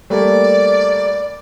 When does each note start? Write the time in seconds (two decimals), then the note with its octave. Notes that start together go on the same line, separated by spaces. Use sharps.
0.10 G3 A3 A#3 D5